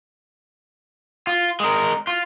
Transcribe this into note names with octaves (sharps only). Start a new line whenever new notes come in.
F4
G#3 A#4
F4